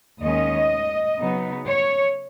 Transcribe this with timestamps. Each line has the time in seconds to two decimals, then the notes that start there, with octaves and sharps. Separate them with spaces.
0.20 D#2 D#3 G#3 C#4 D#5
1.18 C#3 F#3 B3 D#4
1.66 C#5